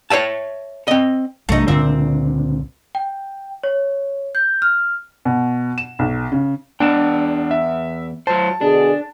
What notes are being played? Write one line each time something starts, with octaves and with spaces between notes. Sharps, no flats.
C#5 D5 E5 A5
C4 D#5
B1 C3 A3 D4 D#4
C#2 A#2 D3 C4 E5
G5
C#5
G6
F6
B2
E7
B1
C#3
E2 B3 D4 G5 E7
E5
F#3 C5 A5
B2 D3 D4 G#4